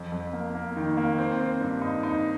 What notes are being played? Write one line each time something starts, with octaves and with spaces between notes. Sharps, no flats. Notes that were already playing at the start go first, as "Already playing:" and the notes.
Already playing: F2
F2
A#3
A#3
D#3
A#3
C4
C4
G2
D#4
D#4